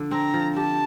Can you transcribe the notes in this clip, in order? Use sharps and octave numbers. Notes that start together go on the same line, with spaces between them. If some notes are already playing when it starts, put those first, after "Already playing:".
Already playing: D3 F3
C4 A#5
F3
G4 A5